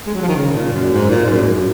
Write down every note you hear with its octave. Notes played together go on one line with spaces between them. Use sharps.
G#3
F#3
F3
D#3
C#3
A#2
F#2
G#2
A#2
G#2
F#2
G#2
F#2